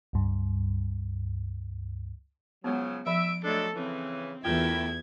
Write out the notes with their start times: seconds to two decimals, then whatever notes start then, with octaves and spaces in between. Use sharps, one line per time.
0.13 C#2 G2
2.64 C#3 F3 F#3 G#3 B3
3.06 F3 E5 B5 D7
3.45 F#3 G#3 A3 D4 A4
3.76 C#3 E3 C4
4.45 E2 A3 E4 F4 A#4 G5 G#6